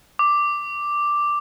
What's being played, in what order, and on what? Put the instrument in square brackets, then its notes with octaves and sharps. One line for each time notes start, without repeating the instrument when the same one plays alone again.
[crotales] D6